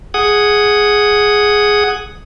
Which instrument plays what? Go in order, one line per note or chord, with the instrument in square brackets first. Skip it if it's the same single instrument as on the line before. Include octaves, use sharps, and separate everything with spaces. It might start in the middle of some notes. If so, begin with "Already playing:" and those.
[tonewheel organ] G#4 F#5 D#6